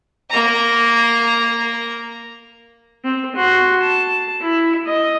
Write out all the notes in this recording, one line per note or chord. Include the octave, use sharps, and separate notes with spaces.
A#3 A#5
C4
F#4 C6
A5
E4
D#5